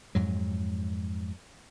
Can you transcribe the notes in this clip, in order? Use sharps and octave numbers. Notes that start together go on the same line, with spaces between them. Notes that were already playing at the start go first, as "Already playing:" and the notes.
F2 G#2 F#3